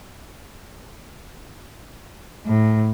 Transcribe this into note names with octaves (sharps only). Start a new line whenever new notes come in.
A2